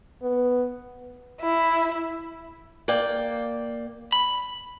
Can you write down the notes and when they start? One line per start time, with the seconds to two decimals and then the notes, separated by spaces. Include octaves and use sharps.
0.22 B3
1.41 E4
2.88 A#3 D5 G5
4.12 B5